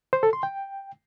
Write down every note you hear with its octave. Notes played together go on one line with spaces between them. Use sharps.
C5
A4
C6
G5